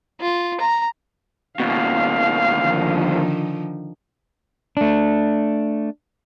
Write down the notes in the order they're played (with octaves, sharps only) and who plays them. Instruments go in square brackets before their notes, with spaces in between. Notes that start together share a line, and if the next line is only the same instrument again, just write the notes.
[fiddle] F4
A#5
[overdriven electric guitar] D#2 B2 [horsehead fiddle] F5
[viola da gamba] D3 D#3 F3
[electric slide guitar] A3 D4